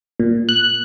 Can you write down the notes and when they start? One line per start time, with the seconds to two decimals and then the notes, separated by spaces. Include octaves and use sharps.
0.20 A#2
0.49 F#6